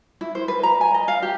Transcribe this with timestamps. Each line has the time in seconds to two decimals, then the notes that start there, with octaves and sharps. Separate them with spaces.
0.21 E4
0.35 C5
0.48 B4
0.63 A#5
0.81 G#5
0.94 D#5
1.08 F5
1.22 G4